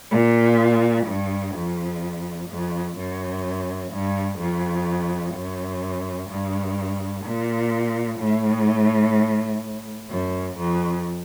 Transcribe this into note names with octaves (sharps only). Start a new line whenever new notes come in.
A#2
G2
F2
F2
F#2
G2
F2
F#2
G2
A#2
A2
F#2
F2